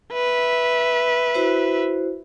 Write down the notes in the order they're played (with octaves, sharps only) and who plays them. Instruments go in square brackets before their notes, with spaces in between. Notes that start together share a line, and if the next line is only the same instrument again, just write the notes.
[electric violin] B4 E5
[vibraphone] E4 F#4 C5